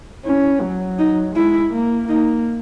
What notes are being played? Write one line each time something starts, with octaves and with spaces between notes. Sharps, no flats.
C#4 E4
F#3
D#4
G#3 E4
A#3
A#3 D#4